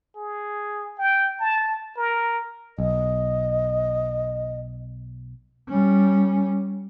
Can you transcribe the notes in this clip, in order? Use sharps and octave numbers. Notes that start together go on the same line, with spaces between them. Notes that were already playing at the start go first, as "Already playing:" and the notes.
G#4
G5
A5
A#4
B1 D#5
G3 C#4